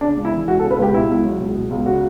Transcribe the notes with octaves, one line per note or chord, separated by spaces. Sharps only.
C#3 D4
C#2
E4
E3
C#2 F#4
A4
C#3
B4
C#2 G4
B2 E4
C#2
F#3
C#2
B2
C#2
C#3 F#4